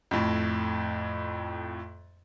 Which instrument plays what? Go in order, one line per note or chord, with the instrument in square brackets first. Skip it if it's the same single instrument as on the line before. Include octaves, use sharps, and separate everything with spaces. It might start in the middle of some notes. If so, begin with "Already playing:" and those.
[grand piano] F2 A2